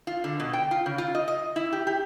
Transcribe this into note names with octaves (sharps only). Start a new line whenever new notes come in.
F4
D3
B2
G5
F4
C#3
F4
D#5
D#5
E4
G4
G4